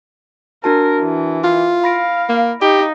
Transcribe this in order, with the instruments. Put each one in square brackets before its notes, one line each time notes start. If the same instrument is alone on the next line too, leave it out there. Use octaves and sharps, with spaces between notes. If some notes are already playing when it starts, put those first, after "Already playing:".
[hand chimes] D4 F#4 A5 [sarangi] A#4
[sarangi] E3
[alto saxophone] F4
[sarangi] F5 [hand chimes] B5 A#6 D7
[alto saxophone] A#3
[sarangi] D#4 [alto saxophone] G4